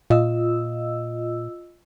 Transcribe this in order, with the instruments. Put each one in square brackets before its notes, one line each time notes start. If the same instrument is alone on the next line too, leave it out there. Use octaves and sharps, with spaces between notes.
[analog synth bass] A#2 [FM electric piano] F4 D#5 E6